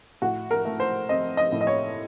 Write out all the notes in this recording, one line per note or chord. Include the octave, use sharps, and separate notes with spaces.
A2 F#4
A#4
A3
C5
C4 D#5
D#5
A2
D#5
C#5